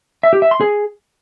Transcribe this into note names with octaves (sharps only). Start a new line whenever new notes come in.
E5
G4
E5
C6
G#4